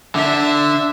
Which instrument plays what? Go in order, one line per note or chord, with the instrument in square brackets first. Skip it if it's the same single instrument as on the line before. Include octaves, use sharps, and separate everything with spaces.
[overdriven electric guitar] D3 [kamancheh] E5